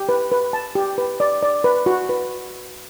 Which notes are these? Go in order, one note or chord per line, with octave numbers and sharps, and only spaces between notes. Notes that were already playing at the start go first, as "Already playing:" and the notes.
Already playing: G4
B4
B4
A5
G4
B4
D5
D5
B4
F#4
B4